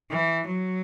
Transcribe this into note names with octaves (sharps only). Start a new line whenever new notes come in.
E3
F#3